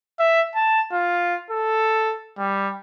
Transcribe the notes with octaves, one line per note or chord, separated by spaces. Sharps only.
E5
A5
F4
A4
G3